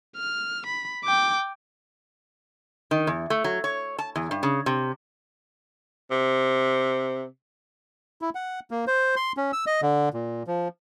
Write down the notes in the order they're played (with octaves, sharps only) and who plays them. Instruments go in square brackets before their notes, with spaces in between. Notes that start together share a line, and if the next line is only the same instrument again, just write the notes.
[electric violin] F6
B5
G5 D6
[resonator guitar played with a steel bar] D#3
E2
A3
F#3
C#5
A5
E2
G2
C#3
C3
[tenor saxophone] C3
[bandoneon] E4
F#5
A#3
C5
C6
C#4
E6
D#5
D3
A#2
F3